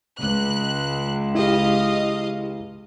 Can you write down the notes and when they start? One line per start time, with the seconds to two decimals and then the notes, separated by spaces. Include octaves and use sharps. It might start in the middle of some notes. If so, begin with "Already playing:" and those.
0.21 C#2 F#6
1.35 E4 G4 D#5 F5